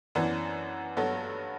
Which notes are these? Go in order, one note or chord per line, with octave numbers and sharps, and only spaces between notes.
F#2 E3 B3 D4
G2 F#3 B3 F#4 A4